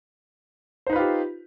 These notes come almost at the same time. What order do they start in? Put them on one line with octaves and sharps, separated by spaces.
C5 D#4 B4 F4 G4